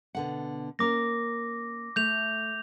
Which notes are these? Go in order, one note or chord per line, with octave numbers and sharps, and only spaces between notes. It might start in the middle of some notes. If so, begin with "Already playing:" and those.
B2 D3 F#5
A#3 C#4 A#4 D6 A#6
A3 G6 F7